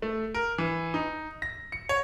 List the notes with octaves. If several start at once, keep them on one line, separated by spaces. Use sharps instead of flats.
A3
A#4
E3
D#4
A#6
C#7
C#5